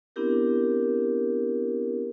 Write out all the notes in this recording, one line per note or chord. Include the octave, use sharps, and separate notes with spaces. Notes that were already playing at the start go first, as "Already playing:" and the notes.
B3 C4 D4 E4 G4 A#4